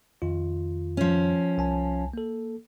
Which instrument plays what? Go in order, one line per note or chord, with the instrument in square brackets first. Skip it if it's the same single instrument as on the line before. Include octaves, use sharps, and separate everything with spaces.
[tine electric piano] F2 D#3 F4
[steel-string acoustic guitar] F3 C#4
[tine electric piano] C2 G#5 A5
A#3 A4